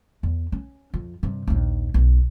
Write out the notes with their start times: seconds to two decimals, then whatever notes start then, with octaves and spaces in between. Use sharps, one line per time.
0.23 E2
0.52 C#4
0.94 F2
1.23 G2 C3
1.47 A#1 D#2
1.94 B1